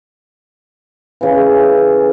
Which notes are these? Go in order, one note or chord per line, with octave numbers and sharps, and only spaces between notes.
C#3 E3